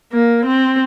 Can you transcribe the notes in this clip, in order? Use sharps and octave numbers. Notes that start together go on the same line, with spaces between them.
A#3
C4